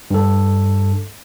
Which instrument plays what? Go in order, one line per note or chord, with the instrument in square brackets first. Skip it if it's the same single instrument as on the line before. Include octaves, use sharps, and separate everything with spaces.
[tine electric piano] G2 A4